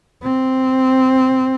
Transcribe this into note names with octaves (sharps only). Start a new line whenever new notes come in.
C4